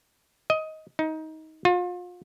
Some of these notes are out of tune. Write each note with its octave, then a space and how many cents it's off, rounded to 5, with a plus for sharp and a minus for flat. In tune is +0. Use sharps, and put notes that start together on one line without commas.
D#5 +15
D#4 +20
F4 +35